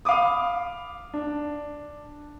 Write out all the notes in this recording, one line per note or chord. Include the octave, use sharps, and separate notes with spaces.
F5 B5 D6 D#6
D4